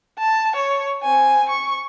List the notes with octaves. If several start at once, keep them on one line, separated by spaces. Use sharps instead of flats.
A5
C#5
C4 G#5
C#6